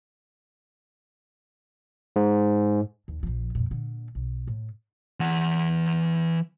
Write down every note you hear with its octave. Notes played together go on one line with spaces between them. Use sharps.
G#2
D#2
A#1 F3
F2 A#2
A#2 D3
B1
A2
E3 F#5